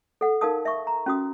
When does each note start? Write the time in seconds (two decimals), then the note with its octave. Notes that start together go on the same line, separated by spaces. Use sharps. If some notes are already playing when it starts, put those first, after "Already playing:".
0.21 A4 F#5
0.41 D#4 A#4 F5 A5 D#6
0.65 E5 C#6
0.87 A#5
1.06 C#4 F#4 D#6